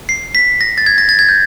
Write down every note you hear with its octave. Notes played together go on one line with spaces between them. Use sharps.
C7
B6
A#6
A6
G#6
A#6
A6
G#6
G6